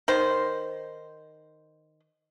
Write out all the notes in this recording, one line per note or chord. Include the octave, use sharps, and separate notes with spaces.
D#3 C5